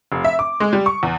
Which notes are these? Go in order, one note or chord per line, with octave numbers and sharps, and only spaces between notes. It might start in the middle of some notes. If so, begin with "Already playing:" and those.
F1
E5
D6
G#3
G3
C#6
E2